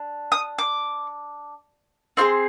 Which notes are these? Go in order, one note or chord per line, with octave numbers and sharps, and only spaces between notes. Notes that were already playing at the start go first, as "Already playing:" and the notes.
Already playing: D4
D#6
D6
C4 F4 G#4 C6